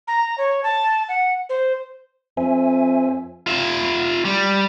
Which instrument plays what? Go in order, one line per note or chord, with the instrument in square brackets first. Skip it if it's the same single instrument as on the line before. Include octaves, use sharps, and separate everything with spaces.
[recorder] A#5
C#5
A5
F#5
C5
[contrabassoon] F2 [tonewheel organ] C5 E5 G#5
[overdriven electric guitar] F4 E5
G3